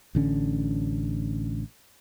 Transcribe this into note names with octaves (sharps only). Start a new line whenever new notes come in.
A1 D3 C#4